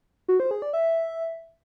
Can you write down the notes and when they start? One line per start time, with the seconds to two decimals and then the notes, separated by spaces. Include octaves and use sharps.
0.28 F#4
0.40 C5
0.51 G#4
0.62 D5
0.73 E5